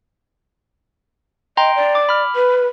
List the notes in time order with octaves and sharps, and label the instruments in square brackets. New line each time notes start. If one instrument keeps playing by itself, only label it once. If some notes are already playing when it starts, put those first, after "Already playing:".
[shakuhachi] D#5 [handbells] G5 A#5 C6
[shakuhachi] D5
[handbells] D6
B5 F6
[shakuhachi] B4